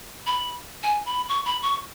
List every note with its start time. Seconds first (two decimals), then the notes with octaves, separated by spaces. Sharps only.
0.27 B5
0.83 G#5
1.06 B5
1.29 C#6
1.45 B5
1.62 C#6